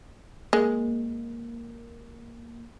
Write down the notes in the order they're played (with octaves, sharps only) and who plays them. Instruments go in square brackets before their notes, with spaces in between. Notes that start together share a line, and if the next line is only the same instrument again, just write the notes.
[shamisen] G#3 [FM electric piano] A#3